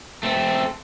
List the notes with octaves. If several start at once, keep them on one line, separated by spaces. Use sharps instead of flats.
A3 C4